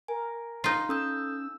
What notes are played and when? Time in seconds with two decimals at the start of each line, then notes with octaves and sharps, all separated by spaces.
0.08 A#4 G#5
0.64 D#4 F4
0.89 C#4 A4 D#6 E6 G6